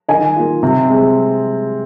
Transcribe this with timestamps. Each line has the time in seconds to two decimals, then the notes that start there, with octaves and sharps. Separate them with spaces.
0.09 D#3 D#5 G#5
0.36 A#3 F4
0.63 C3
0.89 G#3 C4